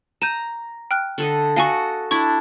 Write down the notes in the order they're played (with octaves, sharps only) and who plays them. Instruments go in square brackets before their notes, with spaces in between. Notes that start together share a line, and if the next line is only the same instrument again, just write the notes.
[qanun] A#5 [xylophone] G6 D#7 E7
[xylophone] G5 F6 F#6
[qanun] D3 A4 D#5
[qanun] F#4 A4 D#5 [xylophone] F5 G#5 C#6
[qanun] D4 E4 A5 [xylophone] C#6 G#6